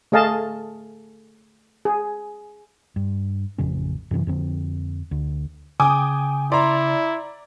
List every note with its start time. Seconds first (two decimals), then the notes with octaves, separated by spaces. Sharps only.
0.12 A3 G#4 D#5 F5 A5
1.85 G#4
2.96 G2
3.58 A1 F2 C#3 C#4
4.11 F#2 C3 D#3 E3
4.27 F2 D3 C4
5.11 D2
5.80 C#3 G5 G#5 D6 D#6
6.52 E4 D5 A#5 C6